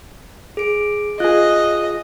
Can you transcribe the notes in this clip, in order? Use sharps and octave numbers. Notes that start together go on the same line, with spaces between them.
G#4 D7
F4 G#4 D#5 F#6